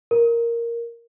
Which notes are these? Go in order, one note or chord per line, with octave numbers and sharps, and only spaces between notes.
A#4